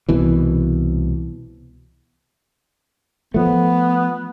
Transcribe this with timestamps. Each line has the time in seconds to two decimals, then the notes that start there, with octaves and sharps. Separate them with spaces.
0.09 C2 B2 E3
3.34 F3 A3 B3